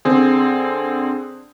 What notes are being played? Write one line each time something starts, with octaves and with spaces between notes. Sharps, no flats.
D3 C4 G#4